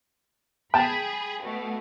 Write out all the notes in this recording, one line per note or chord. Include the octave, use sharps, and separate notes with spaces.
G#4 G5 A5 B5
B2 A3